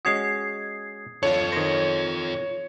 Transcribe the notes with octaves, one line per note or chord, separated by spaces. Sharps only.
G#3 C#4 F#4 D#6 G#6 C7
D3 F4 A4 C#5
D#3 C5 A#6